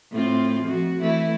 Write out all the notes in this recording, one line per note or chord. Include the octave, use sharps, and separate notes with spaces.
A2 C4 F4
F2 F#4
E3 A3 E4